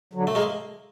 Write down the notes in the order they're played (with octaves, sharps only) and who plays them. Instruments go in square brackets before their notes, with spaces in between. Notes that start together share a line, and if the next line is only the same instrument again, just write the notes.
[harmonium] D3 F#3
[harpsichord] A3
G#3 A#3